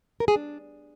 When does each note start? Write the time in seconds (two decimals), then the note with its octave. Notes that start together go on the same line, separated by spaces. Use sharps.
0.20 A#4
0.28 G#4
0.36 D4